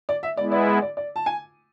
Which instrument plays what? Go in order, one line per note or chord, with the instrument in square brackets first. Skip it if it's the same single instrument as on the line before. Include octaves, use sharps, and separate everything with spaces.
[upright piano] D5
E5
[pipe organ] G#3 B3 E4 [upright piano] D5
[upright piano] D5
E5
D5
D5
A5
G#5